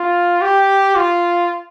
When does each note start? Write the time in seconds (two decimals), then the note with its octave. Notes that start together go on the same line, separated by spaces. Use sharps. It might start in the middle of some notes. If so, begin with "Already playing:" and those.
Already playing: F4
0.41 G4
0.96 F4